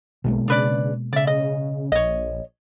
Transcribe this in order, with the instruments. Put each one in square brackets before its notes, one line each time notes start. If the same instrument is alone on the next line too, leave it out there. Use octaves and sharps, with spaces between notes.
[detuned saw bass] B1 [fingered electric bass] B2 G#3 A#3
[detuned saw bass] C#3 [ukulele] D4 B4 D5
[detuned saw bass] C#3 [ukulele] D5 E5
[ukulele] D#5
[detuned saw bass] A#1 [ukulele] C#5 D#5